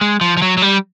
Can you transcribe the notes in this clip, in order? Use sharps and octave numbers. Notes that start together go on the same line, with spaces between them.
G#3
F3
F3
F#3
F#3
G3